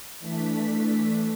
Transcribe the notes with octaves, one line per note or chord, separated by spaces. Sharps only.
E3 A3 D4 B6